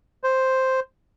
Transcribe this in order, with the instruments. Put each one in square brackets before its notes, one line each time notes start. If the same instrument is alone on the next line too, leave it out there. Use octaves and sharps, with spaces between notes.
[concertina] C5